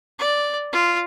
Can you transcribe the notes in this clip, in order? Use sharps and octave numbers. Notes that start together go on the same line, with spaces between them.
D5
F4